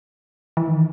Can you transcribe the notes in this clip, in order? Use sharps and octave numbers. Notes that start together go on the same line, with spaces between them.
E3
D#3